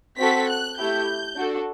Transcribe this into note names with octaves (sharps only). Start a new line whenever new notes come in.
C4 F#4 A4 B6
F#6
A3 E4 G4 G6
D4 F#4 A4